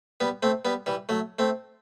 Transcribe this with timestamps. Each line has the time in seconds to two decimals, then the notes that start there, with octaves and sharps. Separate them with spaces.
0.20 G3 B3
0.43 A3 C4
0.65 G3 B3
0.86 E3 G3
1.09 F#3 A3
1.39 A3 C4